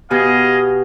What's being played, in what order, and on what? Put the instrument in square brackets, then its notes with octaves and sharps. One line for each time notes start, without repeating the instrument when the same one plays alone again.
[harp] B2 G4 G#5 [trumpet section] G#4 D#5 F5